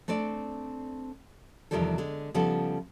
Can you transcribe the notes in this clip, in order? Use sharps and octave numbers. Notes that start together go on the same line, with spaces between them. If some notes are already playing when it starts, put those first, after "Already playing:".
A3 C4 D4 D5
E2 C3 D#3 F3 G3 A4
D3 G#3
C#3 F3 G3 B3 A4